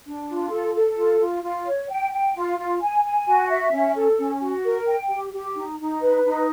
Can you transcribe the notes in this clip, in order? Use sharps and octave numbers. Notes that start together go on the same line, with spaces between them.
D4
F4
A4
A4
F4
F4
F4
C#5
G5
G5
F4
F4
G#5
G#5
F#4
E5
C#4
A4
C#4
F#4
A#4
G5
G4
G4
D#4
D#4
B4
D#4